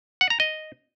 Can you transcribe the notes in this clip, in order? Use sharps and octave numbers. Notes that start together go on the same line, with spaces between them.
F#5
A#5
D#5